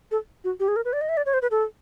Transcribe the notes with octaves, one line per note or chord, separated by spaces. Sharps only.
A4
F#4
G4
G#4
A#4
B4
D5
D#5
E5
D5
C#5
C5
B4
A4